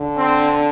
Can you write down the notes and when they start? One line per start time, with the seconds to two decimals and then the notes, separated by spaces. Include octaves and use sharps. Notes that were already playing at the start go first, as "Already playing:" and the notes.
Already playing: D3
0.17 C4